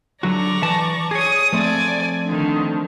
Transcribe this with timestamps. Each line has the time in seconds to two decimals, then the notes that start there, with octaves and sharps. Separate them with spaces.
0.23 D3 F#3 F#4 D5 A#5 C#6
0.62 E3 A5
1.11 G#4 C#5 D#6
1.52 F3 A3 C4 D5 G#5
2.27 D3 D#3